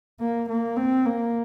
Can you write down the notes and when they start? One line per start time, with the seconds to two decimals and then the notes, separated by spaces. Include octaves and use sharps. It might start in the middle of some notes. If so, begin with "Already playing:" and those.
0.20 A#3
0.49 A#3
0.77 C4
1.06 A#3